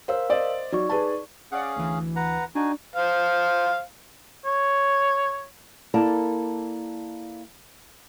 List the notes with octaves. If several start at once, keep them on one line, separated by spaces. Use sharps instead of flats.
A#4 C5 F5 E6
C5 D5 D#5
F#3 D#4 D5 C#6
G#4 B4 A5
C#4 G#4 D5 F5 F#5
D2 E3
B4 F#5 A#5
D4 D#4 F#4 G#5
C5 F5
C#5
A#3 E4 A4 A#4 D5 A5